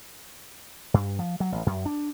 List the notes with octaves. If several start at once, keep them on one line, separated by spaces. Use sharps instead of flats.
G2
F3
F#3
A1
F#2
D4